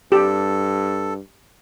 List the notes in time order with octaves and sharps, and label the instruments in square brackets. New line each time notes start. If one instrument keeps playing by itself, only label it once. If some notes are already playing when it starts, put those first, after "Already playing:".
[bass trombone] G2 [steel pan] G4 [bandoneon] A4